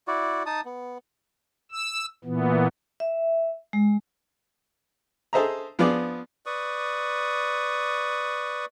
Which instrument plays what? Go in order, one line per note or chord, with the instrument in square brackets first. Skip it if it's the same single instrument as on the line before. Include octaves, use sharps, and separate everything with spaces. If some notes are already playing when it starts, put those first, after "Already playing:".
[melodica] E4 F#4 D5
D#4 A5 D#6
B3
[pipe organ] E6
A#2 E3 B3
[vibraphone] E5
G#3
[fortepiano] G#4 A4 C5 D#5 E5 A#5
F3 B3 F4 G#4 D5
[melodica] B4 D5 C#6 D#6